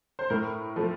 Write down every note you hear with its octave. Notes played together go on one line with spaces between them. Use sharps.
C5
A2 A#4
F3 A3